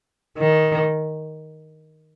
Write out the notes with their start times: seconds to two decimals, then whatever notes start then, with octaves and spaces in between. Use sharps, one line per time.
0.38 D#3